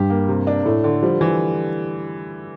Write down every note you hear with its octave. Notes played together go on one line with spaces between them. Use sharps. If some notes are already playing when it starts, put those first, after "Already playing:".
Already playing: G2 G4
A#3
C3
D4
A2 A3
D3
F3 G3
E3